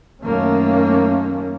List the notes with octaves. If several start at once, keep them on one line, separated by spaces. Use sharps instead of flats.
F#2 D#3 A3 A#3 C#4